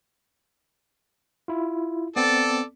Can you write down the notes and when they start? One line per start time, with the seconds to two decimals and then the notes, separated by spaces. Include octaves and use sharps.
1.48 E4 F4
2.16 B3 C4 A4 D5